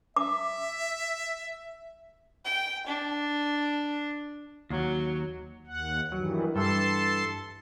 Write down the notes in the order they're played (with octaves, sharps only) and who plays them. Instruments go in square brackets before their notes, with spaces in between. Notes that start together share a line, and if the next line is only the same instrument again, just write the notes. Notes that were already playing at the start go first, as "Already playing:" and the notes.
[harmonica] E5 [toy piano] D6
[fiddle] G5
D4
[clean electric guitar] D#2 [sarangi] F#3
[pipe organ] D#2 F#5
[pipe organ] G2 D#3 E3 [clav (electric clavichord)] F#3
[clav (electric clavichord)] G2 E3 [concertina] A4 [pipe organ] A5 C6